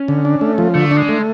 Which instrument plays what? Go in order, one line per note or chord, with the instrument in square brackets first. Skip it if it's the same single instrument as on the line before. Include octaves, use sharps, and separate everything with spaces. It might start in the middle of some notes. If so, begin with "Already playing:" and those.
Already playing: [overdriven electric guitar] C#4
[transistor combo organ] D3
D4
A3
F3
[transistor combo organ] D3 [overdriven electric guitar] A3
[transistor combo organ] D4
[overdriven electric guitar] G#3
[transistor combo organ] A3